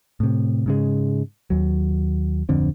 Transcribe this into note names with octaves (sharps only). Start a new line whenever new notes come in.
A2 C3
G#2 C#3 G#3
D#2 F#3
D1 F2 D3 C4